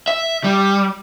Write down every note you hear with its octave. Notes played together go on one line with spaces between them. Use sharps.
E5
G3